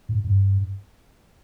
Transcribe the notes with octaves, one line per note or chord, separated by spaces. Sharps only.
G#2
G2